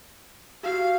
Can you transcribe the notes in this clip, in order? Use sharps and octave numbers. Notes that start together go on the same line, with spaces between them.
F#4 G4 F5